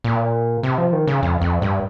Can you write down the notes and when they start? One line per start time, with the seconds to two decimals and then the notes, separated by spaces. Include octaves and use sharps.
0.04 A#2
0.63 C3
0.78 F3
0.93 D#3
1.07 C#3
1.23 F2
1.42 F2
1.62 G2